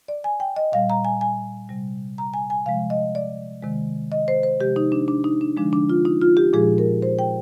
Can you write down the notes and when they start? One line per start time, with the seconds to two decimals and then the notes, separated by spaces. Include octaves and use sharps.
0.08 D5
0.24 G#5
0.40 G5
0.56 D#5
0.72 A#2 G3 F5
0.90 A#5
1.05 G#5
1.21 G#5
1.69 C3 G3
2.18 A#5
2.34 G#5
2.50 G#5
2.66 C3 F3 G#3 F5
2.90 D#5
3.15 D5
3.63 C3 D#3 G#3
4.12 D#5
4.28 C5
4.43 C5
4.60 C3 F3 G#3 G4
4.76 D#4
4.92 D4
5.08 D4
5.24 D#4
5.41 D4
5.57 D3 F3 G#3 D4
5.73 D4
5.90 F4
6.05 D#4
6.21 F4
6.37 G4
6.53 A#2 F3 G#3 G#4
6.78 A#4
7.02 C5
7.19 G5